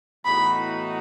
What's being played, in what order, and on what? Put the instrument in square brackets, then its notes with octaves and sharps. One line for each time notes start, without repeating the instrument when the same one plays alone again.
[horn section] A2 E3 B3 D#4 F#4 [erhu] B5